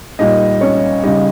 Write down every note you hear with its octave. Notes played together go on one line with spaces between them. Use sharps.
A#2 G3 D#4 D#5
C#4 C#5
C#3 G3 D#4 D#5